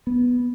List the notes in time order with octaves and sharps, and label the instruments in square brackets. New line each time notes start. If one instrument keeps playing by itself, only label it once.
[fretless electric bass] B3